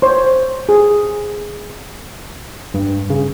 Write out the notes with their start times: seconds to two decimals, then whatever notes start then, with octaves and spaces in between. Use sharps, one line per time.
0.02 C5 C#5
0.69 G#4
2.74 G2
3.10 C#3